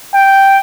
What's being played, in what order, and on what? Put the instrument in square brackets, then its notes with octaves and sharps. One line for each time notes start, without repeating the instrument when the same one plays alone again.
[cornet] G5